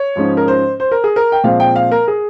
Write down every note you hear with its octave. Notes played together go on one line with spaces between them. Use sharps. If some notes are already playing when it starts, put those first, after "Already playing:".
Already playing: C#5
G#2 F3 G#3 C#4
A#4
C5
C5
A#4
G#4
A#4
G5
A#2 F3 G#3 C4 F5
G5
F5
A#4
G#4